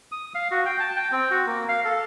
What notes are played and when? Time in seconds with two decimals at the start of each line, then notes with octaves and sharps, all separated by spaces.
0.12 D#6
0.35 F5
0.51 F#4
0.66 G5
0.80 A5
0.96 G5
1.12 C4
1.31 F#4
1.47 A#3
1.69 F5
1.85 A4